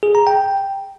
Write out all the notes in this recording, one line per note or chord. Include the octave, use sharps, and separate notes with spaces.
G#4
A#5
G5